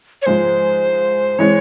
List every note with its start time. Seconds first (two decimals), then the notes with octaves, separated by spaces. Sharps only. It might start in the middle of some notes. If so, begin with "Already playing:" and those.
0.22 C#5
0.26 G#2 F3 G#3 C5
1.39 E3 G#3 C4 C#5